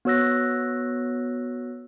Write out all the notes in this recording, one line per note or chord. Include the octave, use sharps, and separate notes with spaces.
B3 F#4 C#5 E6 F#6 A#6